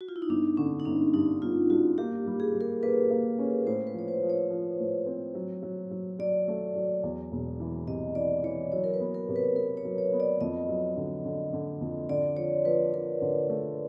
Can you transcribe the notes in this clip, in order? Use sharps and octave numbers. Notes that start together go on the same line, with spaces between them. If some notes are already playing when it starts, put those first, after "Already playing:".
F#4
F4
E4
D#4
G1 D4
D3 C#4
D#4
G1 D4
G2 D#4
G1 F4
G2 F#4
A#3 G4
G3
G#4
G3
A#4
A#3 B4
A#3
C#4
A2 C5
B4
F3 C#5
C5
F3
C#5
F3
A2
C4
F#3
F#3
F#3
F#3 D5
A3
F#3
E2
E1
E3
C3 D#5
E3 D5
E3 C#5
F#3 C#5
A#4
B4
B3
A#4
C3
B4
B3 A#4
C#5
F#3
C#5
B3
D5
F2 D#5
F#3
D3
D3
D3
F2
D3 D5
F3 C#5
F3 B4
F3 A#4
D3
A3